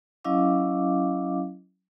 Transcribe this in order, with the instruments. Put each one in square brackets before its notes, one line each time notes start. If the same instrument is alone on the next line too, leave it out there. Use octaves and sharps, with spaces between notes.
[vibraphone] F#3 C#4 E4 D#5 F5 D6